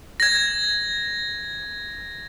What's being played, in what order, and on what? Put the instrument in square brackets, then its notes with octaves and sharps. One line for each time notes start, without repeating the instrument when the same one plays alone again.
[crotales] G#6 A#6